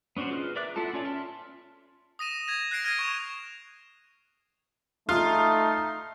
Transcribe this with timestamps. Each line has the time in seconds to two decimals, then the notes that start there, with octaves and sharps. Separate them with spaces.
0.17 B3 C#4 D4 F#4 C5
0.30 F4 G#4 B4 D#5 F6
0.56 A#4 D5 E5 D6 F#6
0.76 B3 E4 F4 A4 A5
0.93 C#4 F4 C#5 D5
1.05 E5 A5 C6 F6
2.19 D#6 A#6 D#7 E7
2.47 G#6 A#6 D#7
2.71 F#6 A#6 C7 D7
2.84 F6 G#6 A#6 D7 D#7
2.99 C#6 E7 F7
5.09 A3 D#4 F4